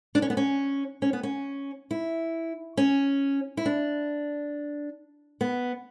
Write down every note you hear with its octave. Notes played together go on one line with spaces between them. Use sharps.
D4
C#4
B3
C#4
C#4
B3
C#4
E4
C#4
E4
D4
B3